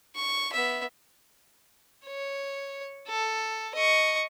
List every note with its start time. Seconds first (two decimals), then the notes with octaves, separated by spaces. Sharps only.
0.16 C#6
0.53 B3 E5
2.07 C#5
3.08 A4
3.75 D#5 C#6